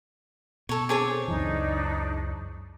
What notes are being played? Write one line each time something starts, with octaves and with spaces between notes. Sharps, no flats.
B2 A4 C#5
C4 G#4 A4 C#5 D6
C#2 F#2 E3 D4 D#4